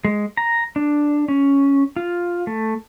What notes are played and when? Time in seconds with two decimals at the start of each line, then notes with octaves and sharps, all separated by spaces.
0.05 G#3
0.37 A#5
0.76 D4
1.28 C#4
1.96 F4
2.47 A3